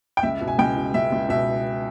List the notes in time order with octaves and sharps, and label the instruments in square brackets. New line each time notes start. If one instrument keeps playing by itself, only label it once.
[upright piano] G5
C#2 E5
B2
G#5
C#2 G5
B2
C#2 E5
C#2
B2 E5